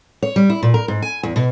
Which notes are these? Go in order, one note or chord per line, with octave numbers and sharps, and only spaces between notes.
C#5
G3
E4
A#2
A#4
G#2
G#5
E2
B2